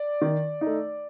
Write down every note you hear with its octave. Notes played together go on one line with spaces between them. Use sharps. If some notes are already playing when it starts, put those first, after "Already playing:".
Already playing: D5
D#3
D#4
A3